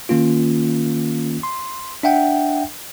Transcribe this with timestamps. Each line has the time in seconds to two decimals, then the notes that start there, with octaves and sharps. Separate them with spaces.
0.09 D#3 A#3 C#4 F4
1.43 C6
2.03 D4 E5 F#5 G5